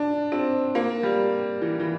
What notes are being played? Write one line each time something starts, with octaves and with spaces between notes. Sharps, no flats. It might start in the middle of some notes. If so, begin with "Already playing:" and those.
Already playing: D4
C4
A#3
G3
E3
E3